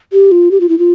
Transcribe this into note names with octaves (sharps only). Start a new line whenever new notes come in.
G4
F4
G4
F4
E4
F4